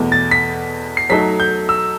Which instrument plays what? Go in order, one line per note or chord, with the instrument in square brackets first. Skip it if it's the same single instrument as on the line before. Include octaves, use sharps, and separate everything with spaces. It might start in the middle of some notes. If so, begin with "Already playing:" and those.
Already playing: [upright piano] E2 B2 A3
[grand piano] A6
B6
C7
[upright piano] F#3 A3 D#4 A4 [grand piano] B6
[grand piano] G6
E6